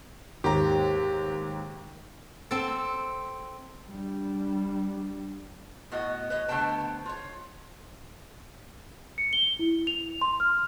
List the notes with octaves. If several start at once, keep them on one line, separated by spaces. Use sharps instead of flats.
D#2 G#2 G4 A#5
C4 A4
G3 D4
A2 B3 F#4 D#5
B4 C#5 D#5
D3 A3 B3 C5 G5 A5
F4 C#5
C#7
G7
E4
F7
C6
F6